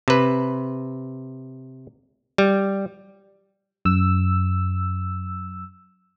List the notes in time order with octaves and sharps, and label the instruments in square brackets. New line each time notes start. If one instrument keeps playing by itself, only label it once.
[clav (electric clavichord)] C3 B4
G3
[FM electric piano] F#2 E6